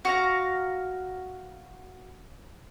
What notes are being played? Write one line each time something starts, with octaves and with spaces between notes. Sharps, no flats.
F#4 F5 A#5